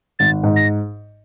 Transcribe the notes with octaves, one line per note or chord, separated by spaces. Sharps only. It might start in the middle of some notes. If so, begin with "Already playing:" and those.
G#1 A6
G#2
A#6